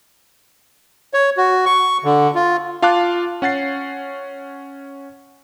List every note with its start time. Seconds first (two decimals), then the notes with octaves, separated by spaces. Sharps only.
1.14 C#5
1.37 F#4
1.66 C#6
2.04 D3
2.35 F4
2.82 F4 F5 A5 D6 F#6
3.42 C#4 F#5 A6 C7